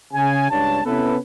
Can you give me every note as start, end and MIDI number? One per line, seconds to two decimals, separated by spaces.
0.14 0.50 49
0.14 0.50 80
0.50 0.80 37
0.50 0.80 43
0.50 0.80 62
0.50 0.80 73
0.50 0.80 81
0.84 1.16 48
0.84 1.16 59
0.84 1.16 61
0.84 1.16 64
0.84 1.16 69
0.84 1.16 71